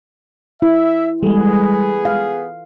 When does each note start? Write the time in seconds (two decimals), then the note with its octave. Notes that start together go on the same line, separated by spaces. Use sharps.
0.62 E4 E5
1.23 E3 G3 G#3 B3 G#4 A4
2.05 F5